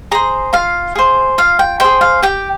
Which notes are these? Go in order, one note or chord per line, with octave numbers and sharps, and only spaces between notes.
G#4 C5 A#5
F4 F5
G#4 C5
F4 F5
G5
G#4 C5 G5
F5
G4 G5